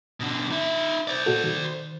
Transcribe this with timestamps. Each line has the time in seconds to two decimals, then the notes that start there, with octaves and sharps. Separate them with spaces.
0.20 B2 D3
0.51 D#4 E5
1.07 C5 D5
1.26 A#2 F#4 A4
1.44 D#3